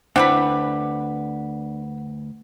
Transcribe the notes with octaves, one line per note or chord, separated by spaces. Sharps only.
D2 C4 D4 E4 B4 F#5 B5